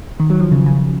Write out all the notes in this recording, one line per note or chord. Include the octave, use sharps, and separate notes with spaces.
D#3
F#3
F3
C#3
C#3